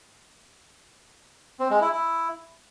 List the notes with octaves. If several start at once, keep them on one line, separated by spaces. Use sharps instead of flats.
C4
G#3
E4
E4